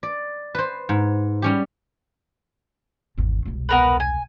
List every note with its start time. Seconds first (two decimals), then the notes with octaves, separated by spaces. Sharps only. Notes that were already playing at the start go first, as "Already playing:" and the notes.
0.03 D5
0.55 B4 C5
0.89 G#2
1.42 G3 C#4 G4
3.18 G#1 E2
3.45 E1 C2
3.69 B3 A#4 B4
4.00 G#5